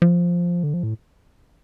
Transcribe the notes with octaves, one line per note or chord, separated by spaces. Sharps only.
F3
D3
F3
A2